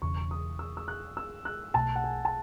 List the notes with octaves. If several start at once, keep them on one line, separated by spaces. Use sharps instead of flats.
E1 E2 C#3 C#6
D#6
E6
E6
F#6
E6
F#6
B1 B2 A3 A5
F#5
G#5
A5